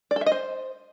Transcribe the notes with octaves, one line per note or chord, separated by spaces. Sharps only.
D5
A4
E5
D#5
C5